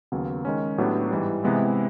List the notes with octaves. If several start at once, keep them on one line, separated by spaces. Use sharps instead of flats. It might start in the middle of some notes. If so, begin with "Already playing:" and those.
D#2 C#3 F#3 B3
D#3 G#3 C#4
A2 F#3 B3 D4 G4
G#2 E3 G3
C3 E3 G#3 B3 E4